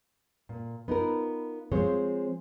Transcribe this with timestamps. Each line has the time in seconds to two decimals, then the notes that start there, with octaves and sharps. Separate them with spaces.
0.49 A#2
0.88 B3 D#4 F4 A#4
1.72 F3 G#3 C4 G#4 C5 C#5